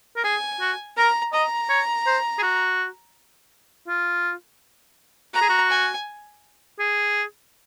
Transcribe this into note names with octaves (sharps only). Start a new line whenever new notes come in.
A#4
G#4 G#5
F#4
A#4 A#5
D#5 A#5
C#5
C5
G#4
F#4
F4
F#4 A#5
G#4
F#4
G#5
G#4